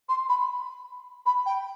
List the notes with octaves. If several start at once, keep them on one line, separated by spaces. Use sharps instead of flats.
C6
B5
B5
G5